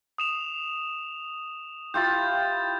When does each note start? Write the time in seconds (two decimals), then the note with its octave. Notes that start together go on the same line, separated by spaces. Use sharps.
0.18 D#6 E7 F7
1.94 E4 F4 G4 G6 A6